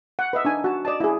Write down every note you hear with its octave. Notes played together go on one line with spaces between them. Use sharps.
F#5
B4 D#5 E5
D4 D#4 G#5
F#4 A5
D5 D#5 A5
E4 G#4